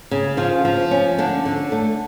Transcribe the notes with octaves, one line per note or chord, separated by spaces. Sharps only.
C#3
F3 F4
F3
C#4
D3 D4
D3
A3